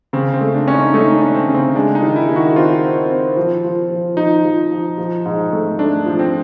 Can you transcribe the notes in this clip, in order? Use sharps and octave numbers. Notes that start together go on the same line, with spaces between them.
C#3 C4
C4
A3
D4
C#4
D#4
A3 D#4
D4
C#4
C4
C#3
C4
G#3 D4
D#4
D#3
E4
D#3
F#4
C4 F4
C4
C4
F3
F3
F3
F3 D#4
F3
F3
F3
G#2
A3
A3 D4
F3
C4